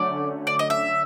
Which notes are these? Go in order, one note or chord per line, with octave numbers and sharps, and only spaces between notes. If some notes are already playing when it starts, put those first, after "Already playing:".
Already playing: D3 F#3 A3 C#4 D5
D5
D#5
E5